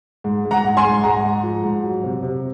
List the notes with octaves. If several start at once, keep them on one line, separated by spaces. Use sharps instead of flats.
G#2
G#2
F#5 A#5
G#2
G#5 C6
G#2
G#3 F#5 A#5
G#2
F3
G#2
F#3
C3
C3